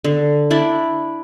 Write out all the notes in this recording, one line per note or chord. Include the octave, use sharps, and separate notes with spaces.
D3
D4 E4 D5